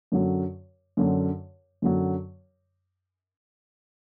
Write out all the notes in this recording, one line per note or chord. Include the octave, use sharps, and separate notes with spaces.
F#2 D3 F#3
F#2 D3 F#3
F#2 D3 F#3